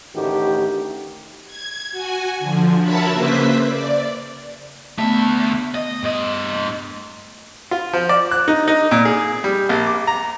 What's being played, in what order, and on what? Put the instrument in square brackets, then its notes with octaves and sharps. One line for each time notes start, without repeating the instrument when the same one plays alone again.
[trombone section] A1 D2 D#3 E4 F#4 G4
[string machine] G#6
F#4 G#5
D3 F3
F#4 A#4 C#5 E5 A5 B5
C#3 A#3 B4 C5 E5 B6
D5
[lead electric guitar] D2 E5 [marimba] A3 B3
[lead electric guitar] D#5
G2 D#5
[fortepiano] F4
F3
D5
F#6
D#4
D#4
A#2
G#4
G3
A#1
D6
A#5